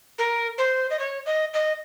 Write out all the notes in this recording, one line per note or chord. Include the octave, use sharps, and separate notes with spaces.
A#4
C5
D#5
C#5
D#5
D#5